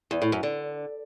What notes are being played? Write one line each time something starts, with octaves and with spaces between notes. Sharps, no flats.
E2
A2
F#2
D3